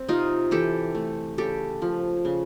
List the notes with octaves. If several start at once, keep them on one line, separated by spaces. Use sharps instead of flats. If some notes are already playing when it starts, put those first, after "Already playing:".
Already playing: C4
C3 D#4 F4
E3 G4 A4
A3
C#3 G4 A4
F3
C#3